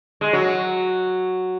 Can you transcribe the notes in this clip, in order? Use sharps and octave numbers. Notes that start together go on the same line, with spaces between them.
G#3
F#3